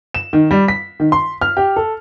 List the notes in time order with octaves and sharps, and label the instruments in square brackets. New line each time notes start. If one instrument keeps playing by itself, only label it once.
[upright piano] E7
D#3
G3
B6
D#3
C6
F6
G4
A4